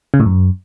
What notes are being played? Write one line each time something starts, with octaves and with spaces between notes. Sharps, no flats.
C#3
A2
F#2